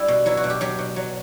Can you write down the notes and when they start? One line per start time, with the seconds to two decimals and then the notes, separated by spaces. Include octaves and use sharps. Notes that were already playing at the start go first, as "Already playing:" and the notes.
Already playing: G3 E4
0.08 B2
0.26 F#3 E4
0.37 F#4
0.44 B2
0.50 G4
0.61 F#3 G4
0.79 B2
0.96 F#3